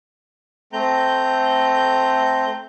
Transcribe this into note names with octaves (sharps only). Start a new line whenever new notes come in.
A3 C4 A#5 G6